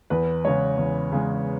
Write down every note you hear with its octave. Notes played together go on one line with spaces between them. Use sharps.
E2 B4
C#3 G#3 C#5
E2
C#3 G#3